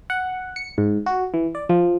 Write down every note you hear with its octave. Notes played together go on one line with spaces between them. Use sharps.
F#5
C#7
G#2
F#4
E3
D5
F3